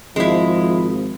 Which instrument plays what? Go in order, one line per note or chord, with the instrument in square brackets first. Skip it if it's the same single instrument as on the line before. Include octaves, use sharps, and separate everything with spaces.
[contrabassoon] G#1 [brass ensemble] F3 [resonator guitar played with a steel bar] G#3 E4